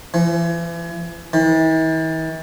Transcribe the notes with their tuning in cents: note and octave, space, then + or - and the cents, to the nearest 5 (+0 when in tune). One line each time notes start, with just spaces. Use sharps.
E3 +40
E3 -45